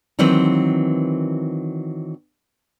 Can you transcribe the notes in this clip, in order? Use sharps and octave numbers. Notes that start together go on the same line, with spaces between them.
D#3 E3 F#3 A#3 C4 B4